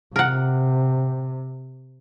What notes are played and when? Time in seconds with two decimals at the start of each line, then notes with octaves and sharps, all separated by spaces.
0.16 C3 A#4 F#5